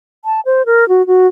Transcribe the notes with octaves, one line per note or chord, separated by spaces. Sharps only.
A5
C5
A#4
F#4
F#4